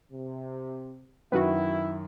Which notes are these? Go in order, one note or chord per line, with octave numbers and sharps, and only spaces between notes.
C3
F#2 D#3 E4 F#4 B4